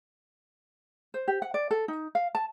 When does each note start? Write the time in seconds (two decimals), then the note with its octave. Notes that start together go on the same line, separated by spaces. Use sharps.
1.14 C5
1.28 G4
1.42 F#5
1.54 D5
1.71 A4
1.88 D#4
2.15 F5
2.35 A5